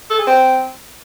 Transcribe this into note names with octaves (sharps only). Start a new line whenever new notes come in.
A4
G#4
C4